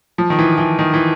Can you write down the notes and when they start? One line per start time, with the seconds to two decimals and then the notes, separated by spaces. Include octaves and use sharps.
0.18 F3
0.30 D#3
0.39 E3
0.58 E3
0.79 D#3
0.94 E3